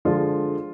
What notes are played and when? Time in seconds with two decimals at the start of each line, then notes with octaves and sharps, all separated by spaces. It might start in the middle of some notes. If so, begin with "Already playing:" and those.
0.05 D3 F3 G#3 F4